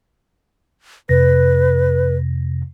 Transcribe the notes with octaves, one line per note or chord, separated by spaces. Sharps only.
F2 C3 B4 A#6